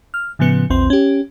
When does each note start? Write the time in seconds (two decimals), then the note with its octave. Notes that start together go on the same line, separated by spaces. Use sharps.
0.14 F6
0.39 A2 C#3 F3 B3 C#7
0.70 A#1 E2 C4 C6
0.90 C#4 G4